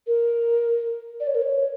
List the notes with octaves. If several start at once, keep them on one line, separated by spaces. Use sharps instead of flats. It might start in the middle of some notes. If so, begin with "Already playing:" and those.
A#4
D5
C#5
A#4
C#5